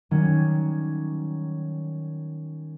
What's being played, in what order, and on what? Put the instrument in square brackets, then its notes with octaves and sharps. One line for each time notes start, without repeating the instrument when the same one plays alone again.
[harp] D#3 F#3 G3 C#4